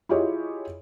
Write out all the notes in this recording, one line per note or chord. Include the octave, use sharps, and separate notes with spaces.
E4 F4 G4 G#4 C#5 D#5